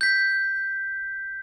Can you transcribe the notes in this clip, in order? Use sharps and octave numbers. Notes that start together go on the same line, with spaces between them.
G6 B6